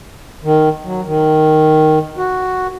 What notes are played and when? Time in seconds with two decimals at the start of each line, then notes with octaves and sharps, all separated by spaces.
0.44 D#3
0.84 F#3
1.05 D#3
2.17 F#4